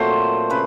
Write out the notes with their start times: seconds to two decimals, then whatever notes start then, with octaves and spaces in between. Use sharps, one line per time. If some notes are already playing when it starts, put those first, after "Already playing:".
Already playing: A#2 F#3 A3 C4 C5
0.50 C#3 B4